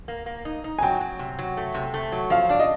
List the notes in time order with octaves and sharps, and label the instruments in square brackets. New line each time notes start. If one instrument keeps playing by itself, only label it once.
[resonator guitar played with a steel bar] A#3
A#3
D#4
D#4
[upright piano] G#5
[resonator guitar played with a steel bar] F#3 [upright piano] G5
[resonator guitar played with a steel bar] F#3
C3
F#3
A3
C3
A3
F#3
[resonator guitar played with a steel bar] F3 [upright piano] F5
[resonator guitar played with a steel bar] D4 [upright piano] D5
[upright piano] D#5